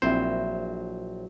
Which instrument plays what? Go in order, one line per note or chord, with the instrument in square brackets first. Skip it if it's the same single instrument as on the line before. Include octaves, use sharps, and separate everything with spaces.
[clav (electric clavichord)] A#1 C5 [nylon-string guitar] F#3 C4 E4